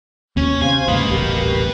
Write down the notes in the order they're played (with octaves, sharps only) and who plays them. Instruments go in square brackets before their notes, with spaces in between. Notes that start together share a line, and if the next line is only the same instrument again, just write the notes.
[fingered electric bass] D#2 B2 [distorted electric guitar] C#4
[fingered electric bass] C3 [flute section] C5 F5 [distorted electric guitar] G#5
[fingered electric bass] D#2 G#2 C#3 [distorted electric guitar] B4 D#5 [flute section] F5
[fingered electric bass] D#1 A1 [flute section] G4 A#4